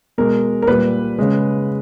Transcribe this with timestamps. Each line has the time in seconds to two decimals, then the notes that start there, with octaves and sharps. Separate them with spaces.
0.18 B2 G#3 A#4
0.62 A#4
0.67 A#2 G3 B4
1.19 C#3 G#3